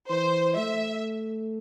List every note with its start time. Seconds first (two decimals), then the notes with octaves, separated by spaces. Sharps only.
0.09 E3 C5
0.57 A3 E5